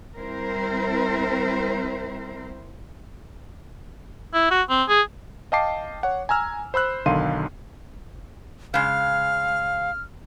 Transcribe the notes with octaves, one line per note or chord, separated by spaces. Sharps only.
G3 C4 E4 A#4 C5
E4
F#4
C4
G#4
D#5 F5 G5 A5 D6 C7
C#5 F#5
G#5 A#5 E6 F6
C5 B5 E6 F#6
B1 D3 D#3 F5 C6 D#7
C#3 G#3 F5 F6